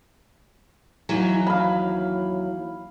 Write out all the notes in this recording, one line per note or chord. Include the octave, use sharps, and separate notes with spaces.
D#2 E3 F#3
F5 B5